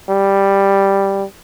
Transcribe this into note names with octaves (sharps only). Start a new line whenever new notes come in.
G3